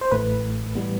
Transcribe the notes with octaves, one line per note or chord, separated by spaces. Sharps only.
C5
A1 A2 E3 A3 B4
A2 E3 G3 B3